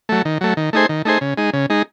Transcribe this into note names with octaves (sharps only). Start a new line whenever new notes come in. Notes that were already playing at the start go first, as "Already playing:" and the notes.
F#3 A3
D#3
F#3 A3
D#3
A3 D#4 G#4 C5
D#3
A3 D#4 G#4 C5
C#3
G#3 D#4
C#3
G#3 D#4